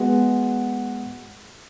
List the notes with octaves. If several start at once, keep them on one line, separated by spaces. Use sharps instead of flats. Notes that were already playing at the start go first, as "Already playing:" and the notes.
Already playing: G#3 B3 F#4